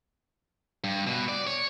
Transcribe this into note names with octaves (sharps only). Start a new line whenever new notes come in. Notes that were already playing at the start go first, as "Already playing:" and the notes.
G2
B2
D5
C#5